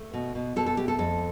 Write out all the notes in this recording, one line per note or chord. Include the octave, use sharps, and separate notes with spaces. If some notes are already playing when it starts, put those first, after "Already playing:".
Already playing: A3
B2
B2
B2 A4
A4
A3 G4
A4
F2 A4